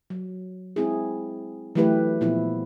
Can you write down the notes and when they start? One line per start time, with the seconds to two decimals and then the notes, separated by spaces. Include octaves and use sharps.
0.10 F#3
0.76 G#3 C4 E4 G#4
1.75 E3 F#3 A3 E4 G4 B4
2.21 A#2 F3 B3 E4